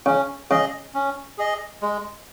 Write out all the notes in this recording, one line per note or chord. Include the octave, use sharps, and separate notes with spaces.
C#3 C#4
C#3 G#4 D#5
C#4
G#4 D#5
G#3